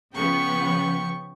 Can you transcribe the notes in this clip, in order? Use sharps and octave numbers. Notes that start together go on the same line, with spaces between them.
C#3 F3 B3 G5 C#6